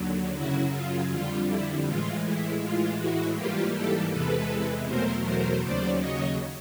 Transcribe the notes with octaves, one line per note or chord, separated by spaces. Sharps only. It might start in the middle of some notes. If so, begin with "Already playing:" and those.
Already playing: D#2 D3 F#3
F#2 C#3 F#3 E4 F#4
F4
F2 D3 G3 F4
E4
A2 E3 G#3 F4
E4
A2 E3 G#3 F4
E4 F#4
G#2 E3 G3 A#3 F4 G4
G4 A4
E2 C3 E3 G#3 A4 B4
E2 B2 F#3 A3 A#4 C5
A#4 C5
D#2 C#3 F#3 C5 D5
C#5 D#5